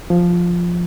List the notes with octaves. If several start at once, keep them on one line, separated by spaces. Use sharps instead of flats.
F3